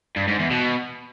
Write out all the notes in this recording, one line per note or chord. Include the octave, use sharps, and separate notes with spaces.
G2
G#2
E2
B2